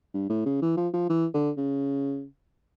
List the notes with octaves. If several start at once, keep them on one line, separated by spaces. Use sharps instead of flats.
G2
A2
C#3
E3
F3
F3
E3
D3
C#3